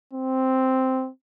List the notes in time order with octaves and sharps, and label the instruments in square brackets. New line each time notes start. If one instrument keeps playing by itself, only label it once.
[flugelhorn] C4